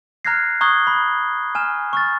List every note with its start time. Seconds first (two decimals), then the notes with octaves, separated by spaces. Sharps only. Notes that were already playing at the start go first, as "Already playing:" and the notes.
0.25 A#5 F6 F#6 G#6 A#6 C7
0.61 A#5 C#6 D#6 F#6 G#6 G7
0.87 B5
1.55 G#5 F6 E7
1.93 C#6 F6 A6